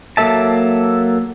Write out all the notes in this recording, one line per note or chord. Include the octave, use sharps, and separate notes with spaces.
F#3 A#3 A4 E5 A5